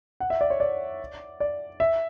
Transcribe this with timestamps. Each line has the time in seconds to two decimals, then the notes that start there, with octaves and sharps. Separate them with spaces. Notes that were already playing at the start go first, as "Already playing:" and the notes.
0.20 F#5
0.30 E5
0.41 D5
0.50 C#5
0.60 D5
1.40 D5
1.80 E5